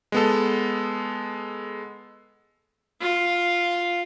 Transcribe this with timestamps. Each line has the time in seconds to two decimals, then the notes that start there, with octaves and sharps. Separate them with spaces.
0.12 G#3 B3 A4
3.01 F4